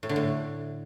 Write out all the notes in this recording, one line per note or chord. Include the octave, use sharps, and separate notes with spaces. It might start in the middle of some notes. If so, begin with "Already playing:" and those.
A2
D3
A2